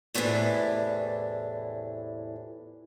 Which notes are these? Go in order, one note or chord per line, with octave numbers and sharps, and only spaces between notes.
E2 A2 C3 D#3 E3 D4